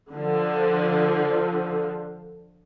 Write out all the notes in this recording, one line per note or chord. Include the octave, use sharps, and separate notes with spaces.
D3 F3